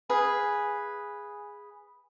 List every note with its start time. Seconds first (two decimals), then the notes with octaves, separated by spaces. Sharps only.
0.09 G#4 B4 F5